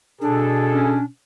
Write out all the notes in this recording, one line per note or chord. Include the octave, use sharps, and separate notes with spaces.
B2 D4 G#4 A4
C#4